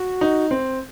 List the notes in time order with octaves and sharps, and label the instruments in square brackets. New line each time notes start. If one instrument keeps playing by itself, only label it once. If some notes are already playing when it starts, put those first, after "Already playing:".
Already playing: [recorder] F#4
[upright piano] D#4
C4